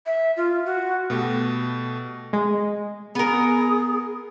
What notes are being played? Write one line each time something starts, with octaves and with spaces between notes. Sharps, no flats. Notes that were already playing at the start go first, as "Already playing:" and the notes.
E5
F4
F#4
B2 A3 G4
G#3
B3 G#4 A#4